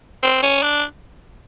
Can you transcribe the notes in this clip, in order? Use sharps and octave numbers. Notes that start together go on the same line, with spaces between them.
C4
C#4
D4